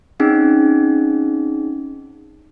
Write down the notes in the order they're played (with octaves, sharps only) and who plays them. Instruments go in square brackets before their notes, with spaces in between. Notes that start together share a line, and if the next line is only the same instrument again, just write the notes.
[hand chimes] C4 C#4 D#4 G#4